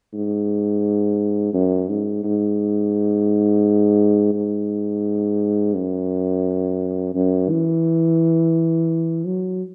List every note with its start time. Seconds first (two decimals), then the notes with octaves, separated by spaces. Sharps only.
0.13 G#2
1.54 F#2
1.89 G#2
2.24 G#2
4.34 G#2
5.75 F#2
7.15 F#2
7.50 E3
9.26 F#3